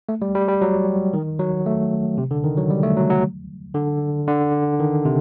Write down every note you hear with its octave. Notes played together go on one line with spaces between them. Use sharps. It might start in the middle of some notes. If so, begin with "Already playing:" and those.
A3
G3
G3
G3
F#3
D#3
F#3
A3
C3
D3
D#3
F#3
G3
A3
F#3
F#3
D3
D3
D#3
C3